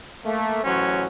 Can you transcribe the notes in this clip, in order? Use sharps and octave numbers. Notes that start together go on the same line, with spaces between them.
A3 A#3
A1 F#3 C#4 C5